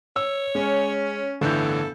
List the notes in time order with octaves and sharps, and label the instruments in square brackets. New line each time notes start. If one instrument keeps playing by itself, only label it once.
[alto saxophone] C#5 [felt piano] E6
[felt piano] G#3 [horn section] C#4
[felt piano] G1 G6 [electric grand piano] A2 D3 E3 [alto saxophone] A4